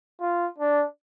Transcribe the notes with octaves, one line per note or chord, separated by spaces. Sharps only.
F4
D4